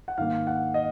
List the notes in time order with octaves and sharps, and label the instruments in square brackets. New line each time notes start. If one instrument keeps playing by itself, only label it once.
[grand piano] F#5
G#2 D#3 A#3 F5
F#5
D#5